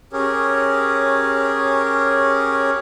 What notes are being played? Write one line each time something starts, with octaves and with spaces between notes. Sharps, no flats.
C#4 G4 G#4 A#4 C#5